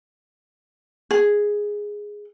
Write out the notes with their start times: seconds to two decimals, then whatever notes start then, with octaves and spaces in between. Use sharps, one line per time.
1.11 G#4